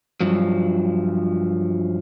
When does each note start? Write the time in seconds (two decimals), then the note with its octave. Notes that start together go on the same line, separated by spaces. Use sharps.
0.21 G2 F3 F#3